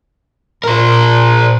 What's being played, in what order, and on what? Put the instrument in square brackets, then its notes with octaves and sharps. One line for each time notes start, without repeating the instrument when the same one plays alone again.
[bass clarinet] A#2 [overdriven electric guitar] A#4 C5